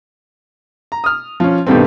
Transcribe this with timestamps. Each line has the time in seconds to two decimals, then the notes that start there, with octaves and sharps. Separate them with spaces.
0.92 A#5
1.04 D#6 F6
1.40 F3 C#4
1.67 G2 B2 D#3 G3 A3 C4